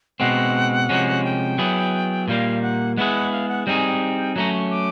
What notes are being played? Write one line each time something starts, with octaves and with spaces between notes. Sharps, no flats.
B2 G#3 C4 F#5
C3 F3 G#3 C#4 F#4
G5
F#3 B3 E4 G#4
A#2 G3 A#3 F5
F#5
G#3 B3 E4 G#4 F#5
F5
F#5
G3 C4 D#4 G#4 G5
G#5
G5
F#3 A3 C#4 A#5
C#6
D6